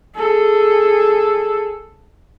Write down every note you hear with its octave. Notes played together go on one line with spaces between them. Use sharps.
G#4 A4